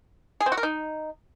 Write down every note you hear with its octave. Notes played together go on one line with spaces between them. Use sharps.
G#4
C4
F#4
A#4
D#4